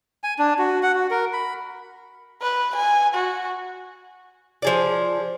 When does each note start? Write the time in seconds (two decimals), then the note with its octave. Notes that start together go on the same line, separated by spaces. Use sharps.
0.24 G#5
0.39 D4
0.59 F#4
0.83 F#5
0.95 F#4
1.10 A#4
1.33 B5
2.42 B4
2.76 G#5
3.15 F#4
4.62 F3 G#4 D5